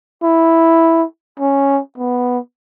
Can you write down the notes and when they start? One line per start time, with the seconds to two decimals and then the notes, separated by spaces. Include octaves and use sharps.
0.23 E4
1.40 C#4
1.98 B3